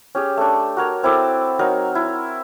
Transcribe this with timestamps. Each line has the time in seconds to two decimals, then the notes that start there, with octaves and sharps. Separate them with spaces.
0.15 C#4 G4 G#4
0.37 A3 D4
0.77 F#4 A#4 C#5
1.03 C4 E4 A4 D5
1.59 F#3 D#4 A#4
1.95 E4